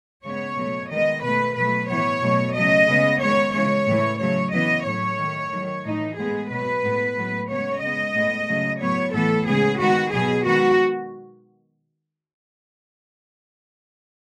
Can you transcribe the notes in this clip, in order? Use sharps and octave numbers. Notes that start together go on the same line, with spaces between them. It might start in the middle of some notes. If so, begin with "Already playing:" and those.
C#3 G#3 B3 C#5
B2 F#3 A3
D#3 G#3 B3 D#5
B2 A3 B4
B2 F#3 A3 B4
A2 E3 B3 C#5
B2 F#3 A3
C#3 F#3 A3 D#5
C#3 G#3 B3
D#3 G#3 B3 C#5
C#3 E3 G#3 C#5
A2 E3 A3
C#3 F#3 A3 C#5
C#3 E3 B3 D#5
A2 F#3 A3 C#5
D#3
A3
D#3 F#3 A3
A2 E3 A3 D#4
A2 G#3 B3 G#4
B2 F#3 B3 B4
A2 G#3 B3
A2 F#3 B3
C#3 G#3 B3 C#5
C#3 G#3 B3 D#5
A2 G#3 B3
C#3 F#3 A3
A2 F#3 B3 C#5
A2 E3 B3 A4
C#3 G#3 B3 G#4
D#3 G#3 B3 F#4
B2 F#3 B3 G#4
D#3 G#3 B3 F#4